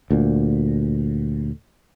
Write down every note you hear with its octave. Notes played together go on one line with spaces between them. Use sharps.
D2 A#2